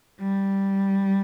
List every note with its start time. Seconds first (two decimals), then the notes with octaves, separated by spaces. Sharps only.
0.20 G3